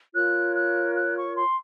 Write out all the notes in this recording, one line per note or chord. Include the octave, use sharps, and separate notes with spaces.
F4 A#4 C#5 F#6
F#6
F#6
C#6
C6